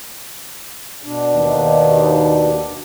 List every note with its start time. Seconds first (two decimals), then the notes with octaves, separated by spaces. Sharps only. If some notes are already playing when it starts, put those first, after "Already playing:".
1.03 B2 D4
1.35 D#2